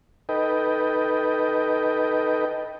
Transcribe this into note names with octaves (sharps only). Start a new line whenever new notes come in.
D#4 A4 B4 D#5 G5